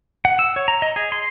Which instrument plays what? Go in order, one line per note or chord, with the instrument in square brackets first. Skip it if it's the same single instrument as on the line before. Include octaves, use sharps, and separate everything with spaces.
[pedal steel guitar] F#5
E6
C#5
A#5
D#5
G#4
C6